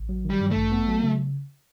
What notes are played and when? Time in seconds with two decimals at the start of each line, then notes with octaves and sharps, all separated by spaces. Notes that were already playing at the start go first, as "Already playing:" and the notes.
Already playing: A1
0.09 F#3
0.25 D#3
0.30 G3
0.41 G2
0.51 A3
0.57 A1
0.72 B3
0.88 F#3
1.03 C#3